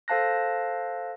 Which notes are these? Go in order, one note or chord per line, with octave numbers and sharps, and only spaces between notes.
A4 C5 F5 A5 F#6 A#6